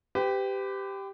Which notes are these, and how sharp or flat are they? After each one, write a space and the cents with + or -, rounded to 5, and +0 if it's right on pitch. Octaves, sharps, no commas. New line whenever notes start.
G4 +0 B4 +40